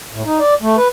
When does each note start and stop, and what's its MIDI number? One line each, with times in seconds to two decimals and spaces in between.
0.13 0.23 45
0.26 0.39 63
0.39 0.54 74
0.62 0.76 57
0.77 0.88 71